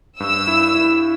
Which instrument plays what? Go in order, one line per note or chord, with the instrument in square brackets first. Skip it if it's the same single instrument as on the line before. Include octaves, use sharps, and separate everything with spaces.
[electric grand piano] G2 [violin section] E6
[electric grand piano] E4
E4